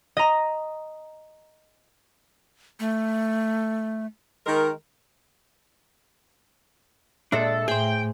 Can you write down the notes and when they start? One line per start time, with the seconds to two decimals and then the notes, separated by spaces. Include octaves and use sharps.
0.17 D#5 A#5
2.80 A3
4.46 D#3 G#3 A#4
7.32 A#2 G#3 D4 A4 E5
7.68 A2 G#4 C5 G5